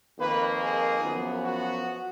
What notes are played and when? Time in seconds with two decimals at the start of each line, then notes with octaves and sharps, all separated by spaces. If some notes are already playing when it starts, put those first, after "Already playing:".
0.19 F2 D#3 A#3 B4
0.60 G#4
1.02 F#2 F3 B3
1.44 F#4